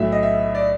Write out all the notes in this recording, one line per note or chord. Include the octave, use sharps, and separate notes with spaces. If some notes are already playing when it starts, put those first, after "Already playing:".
Already playing: B1 A2 F#3 A3 E5
D#5
E5
D5